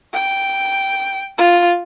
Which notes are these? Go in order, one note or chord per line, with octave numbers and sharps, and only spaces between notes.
G5
F4